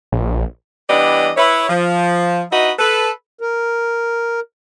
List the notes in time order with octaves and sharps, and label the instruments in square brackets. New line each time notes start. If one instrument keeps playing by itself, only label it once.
[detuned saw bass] A#1
[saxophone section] E3 G3 B3 D4 D5 D#5
E4 B4 C#5
F3
D#4 E4 F#4 B4 D#5
A4 B4
[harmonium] A#4